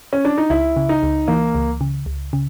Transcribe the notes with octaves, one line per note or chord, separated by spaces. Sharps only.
C#4
D4
D#4
C#2 E4
C#3
D#4
C#2
E3 A#3
C#2
C#3
C#2
C#3